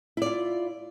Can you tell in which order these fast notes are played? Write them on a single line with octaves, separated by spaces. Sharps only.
E4 D5 F4